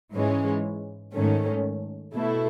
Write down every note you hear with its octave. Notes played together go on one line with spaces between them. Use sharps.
G#2 E3 G#3 C#4
G#2 D#3 A3 C#4
B2 A3 E4